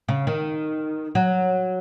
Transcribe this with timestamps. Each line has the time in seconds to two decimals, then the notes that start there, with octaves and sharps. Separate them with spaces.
0.08 C#3
0.27 D#3
1.15 F#3